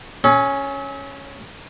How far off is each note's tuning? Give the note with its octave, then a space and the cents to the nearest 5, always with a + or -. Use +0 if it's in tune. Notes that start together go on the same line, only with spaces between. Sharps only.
C#4 +0 A4 -40